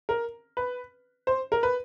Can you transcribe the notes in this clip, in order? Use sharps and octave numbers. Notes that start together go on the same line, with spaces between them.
A#4
B4
C5
A#4
B4